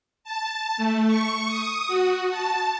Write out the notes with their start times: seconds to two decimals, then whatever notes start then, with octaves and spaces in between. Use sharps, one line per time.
0.24 A5
0.77 A3
1.07 C#6
1.48 D#6
1.88 F#4
2.30 A5